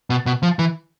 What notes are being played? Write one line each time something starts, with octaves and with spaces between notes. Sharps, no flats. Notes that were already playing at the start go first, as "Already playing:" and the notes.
B2
B2
F3
E3